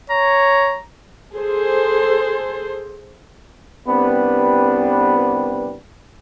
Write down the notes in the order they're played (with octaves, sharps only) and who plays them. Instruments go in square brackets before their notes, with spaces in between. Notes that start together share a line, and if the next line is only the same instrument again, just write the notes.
[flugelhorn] C#5 [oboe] A#5
[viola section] G#4 A4 C5
[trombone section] C2 B3 C4 D4 G4 B4